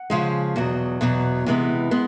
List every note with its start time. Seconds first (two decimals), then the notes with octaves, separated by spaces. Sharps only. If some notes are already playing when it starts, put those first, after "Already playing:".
Already playing: F#5
0.10 C#3 F3 G#3
0.56 E2 B2 F#3
1.01 E2 B2 F#3
1.46 C3 E3 G#3 B3
1.91 G#3 B3